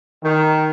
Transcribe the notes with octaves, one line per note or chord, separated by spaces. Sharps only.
D#3